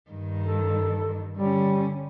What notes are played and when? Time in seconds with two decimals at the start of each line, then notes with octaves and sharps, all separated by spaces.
0.10 G2 D#3
0.43 A4
1.37 D3 G3 C#4